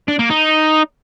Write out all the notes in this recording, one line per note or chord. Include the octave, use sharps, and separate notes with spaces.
D4
A#3
D#4